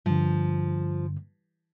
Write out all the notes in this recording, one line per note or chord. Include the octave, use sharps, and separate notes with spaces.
G2 D3 F3